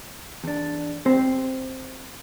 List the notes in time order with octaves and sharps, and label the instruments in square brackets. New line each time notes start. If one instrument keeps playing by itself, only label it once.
[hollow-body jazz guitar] E2 D4
[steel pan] C4 [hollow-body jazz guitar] C5